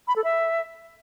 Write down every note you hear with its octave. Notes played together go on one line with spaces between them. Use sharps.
B5
A4
E5